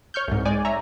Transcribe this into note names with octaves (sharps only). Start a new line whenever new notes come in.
C#5 C#6 F6 G6
C2 G#2
G#3 D5 G#5
C#5 E5 A#5